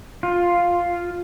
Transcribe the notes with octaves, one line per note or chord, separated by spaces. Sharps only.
F4